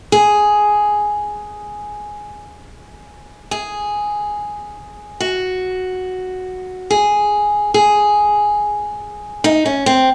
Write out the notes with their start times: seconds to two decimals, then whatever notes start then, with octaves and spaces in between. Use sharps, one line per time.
0.12 G#4
3.51 G#4
5.20 F#4
6.91 G#4
7.74 G#4
9.44 D#4
9.66 C#4
9.86 C4